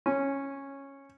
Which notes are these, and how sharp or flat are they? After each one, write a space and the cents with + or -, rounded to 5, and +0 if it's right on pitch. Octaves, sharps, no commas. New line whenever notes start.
C#4 -10